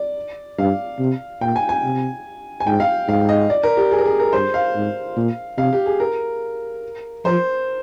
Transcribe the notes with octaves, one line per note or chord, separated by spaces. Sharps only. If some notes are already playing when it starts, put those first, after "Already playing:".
Already playing: D5
G2 F5
C3
A#2 G5
G#5
G#5
C3
G#5
G#2 G5
F5
G#2 F5
D#5
D5
A#4
G4
G#4
A#4
G#4
A#4
G2 C5
F5
G#2
A#2
C3 F5
G4
G#4
A#4
F3 C5